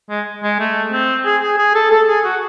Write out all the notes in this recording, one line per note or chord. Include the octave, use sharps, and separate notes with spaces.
G#3
G#3
A3
C4
G#4
G#4
G#4
A4
A4
G#4
F#4